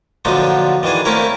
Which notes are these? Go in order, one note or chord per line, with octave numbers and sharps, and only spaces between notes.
A#2 D3 F3 F#3 D4 D#4
D#3 E3 D4 G#4
A3 A#3 C4 C#4 E4 A#4